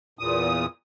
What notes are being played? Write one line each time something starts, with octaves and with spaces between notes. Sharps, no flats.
E2 A#2 D#6